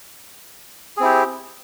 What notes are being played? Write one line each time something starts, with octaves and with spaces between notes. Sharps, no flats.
C4 E4 G4 G#4